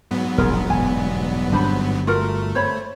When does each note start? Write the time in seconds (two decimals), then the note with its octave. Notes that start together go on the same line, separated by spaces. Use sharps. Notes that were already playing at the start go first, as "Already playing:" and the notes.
0.11 G#2 F#3 B3
0.38 E1 A#1 F4 G#4 A#4
0.70 E1 G2 G#5
1.52 G1 G3 D4 C5 B5
2.07 A3 F4 F#4 A#4
2.55 C5 C#5 B5